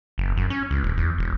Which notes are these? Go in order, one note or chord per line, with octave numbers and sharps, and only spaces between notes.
F#1
F#2
C#4
C#2
D#1
E2
E1